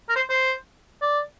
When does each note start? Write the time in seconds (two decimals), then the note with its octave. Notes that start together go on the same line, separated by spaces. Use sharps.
0.09 A#4
0.16 C5
0.30 C5
1.02 D5